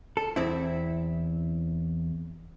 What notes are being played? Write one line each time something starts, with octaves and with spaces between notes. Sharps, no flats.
A4
E2 C4 E4